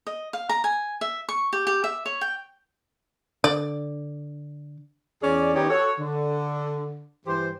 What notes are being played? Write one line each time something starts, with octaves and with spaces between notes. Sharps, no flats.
D#5
F5
A#5
G#5
E5
C#6
G4
G4
E5
C#5
G5
D3 D5
E2 C#4 G#4 D5
D#3 B3 C#4 D#4 G4 C#5
F#4 A4 C#5
D3
G2 E3 G4 C5